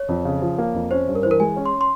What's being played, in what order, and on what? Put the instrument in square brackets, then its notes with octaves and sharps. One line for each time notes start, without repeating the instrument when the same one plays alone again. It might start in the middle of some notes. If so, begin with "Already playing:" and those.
Already playing: [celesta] C#5
[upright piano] F2
C#3
F3
A#3
F2
[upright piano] C#4 [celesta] C5
[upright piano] G2
[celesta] A#4
[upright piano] E3 [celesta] C5
[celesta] A#4
[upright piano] G#3 [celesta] G#5
[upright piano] C#4
[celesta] C6
C6